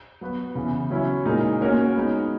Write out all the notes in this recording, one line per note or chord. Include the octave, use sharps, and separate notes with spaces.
F#3 B3 F#4 B4
C#3 E3 B3
F#3 C#4 E4
A#2 G#3 D#4 A#4
A#3 C#4 F#4 A#4 C#5
G#3 B3 D#4